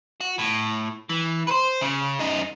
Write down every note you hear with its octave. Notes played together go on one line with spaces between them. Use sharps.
F#4
A2
E3
B4 C5
C#3
F#2 D#4